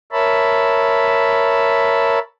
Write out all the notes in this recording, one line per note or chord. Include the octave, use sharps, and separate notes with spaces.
A#4 C#5 E5 A5 B5